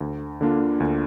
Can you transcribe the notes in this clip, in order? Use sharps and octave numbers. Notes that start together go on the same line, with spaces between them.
D2
D3 A#3 D4 F4
D2